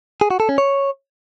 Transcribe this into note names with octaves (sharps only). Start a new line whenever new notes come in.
G#4
F#4
A4
C#4
C#5